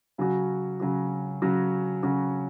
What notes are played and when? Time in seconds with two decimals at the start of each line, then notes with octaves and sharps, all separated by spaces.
0.18 C#3 F#3 C#4 F#4
0.80 C#3 F#3 C#4 F#4
1.42 C#3 F#3 C#4 F#4
2.03 C#3 F#3 C#4 F#4